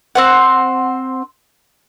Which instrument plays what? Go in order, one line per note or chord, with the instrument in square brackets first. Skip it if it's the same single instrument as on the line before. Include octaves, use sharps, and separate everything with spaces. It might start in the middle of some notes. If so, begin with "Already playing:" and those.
[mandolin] C4 C5 F#5